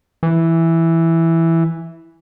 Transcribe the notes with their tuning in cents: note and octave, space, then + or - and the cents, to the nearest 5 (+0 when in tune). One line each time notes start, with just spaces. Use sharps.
E3 +0